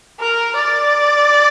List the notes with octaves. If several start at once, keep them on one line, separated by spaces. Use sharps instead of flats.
A#4
D5